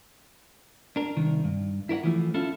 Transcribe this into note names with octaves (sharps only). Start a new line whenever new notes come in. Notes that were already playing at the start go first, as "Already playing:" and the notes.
D4 A#4
C2 D#3
G2
E4 A#4 C#5 F#5
E3 F3 A3
C#4 E4 F4 A4